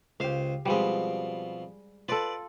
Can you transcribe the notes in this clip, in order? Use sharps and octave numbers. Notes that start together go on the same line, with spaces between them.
C#2 G4 C5 F5
B2 F3 G3 G#3 C4
F4 A4 B4 D5